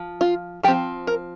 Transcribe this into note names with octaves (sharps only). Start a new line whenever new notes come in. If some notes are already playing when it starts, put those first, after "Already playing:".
Already playing: F3
F4
F3 C4 G4
A#4